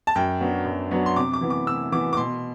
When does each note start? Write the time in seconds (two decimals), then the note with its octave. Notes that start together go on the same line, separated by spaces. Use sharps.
0.07 A5
0.16 F#2 G5
0.41 F#3 B3 D4
0.66 F#2
0.91 F#3 B3 D4
1.06 C6
1.16 C3 D6
1.33 D6
1.41 E3 B3
1.50 D6
1.67 C3 E6
1.92 E3 B3 D6
2.13 D6
2.17 B2 C6